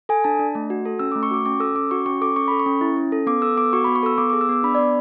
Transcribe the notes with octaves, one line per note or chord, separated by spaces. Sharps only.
A4 G#5
D4 A5
D4
A3
F#4
A4
C#4 E6
D6
A3
C#6
F#4 D6
C#4 D6
A4 E6
C#4 D6
F#4 C#6
C#4 C#6
A4 D6
C#4 C#6
A4 B5
C#6
C#4
E4
C#4
A4
B3 D6
A4 E6
B3 D6
F#4 C#6
B5
B3
C#6
A4 E6
B3 D6
D6
G#4
E6
B3 D6
D4 B5
D5
B3